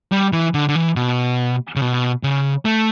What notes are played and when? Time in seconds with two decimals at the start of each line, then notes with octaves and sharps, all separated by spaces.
0.12 G3
0.33 E3
0.54 D3
0.69 D3
0.75 E3
0.96 B2
1.76 C#3
1.81 B2
2.23 C#3
2.65 A3